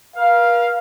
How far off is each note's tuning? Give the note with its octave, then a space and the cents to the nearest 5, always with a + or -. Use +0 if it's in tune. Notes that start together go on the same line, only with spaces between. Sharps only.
A#4 +45 F5 +0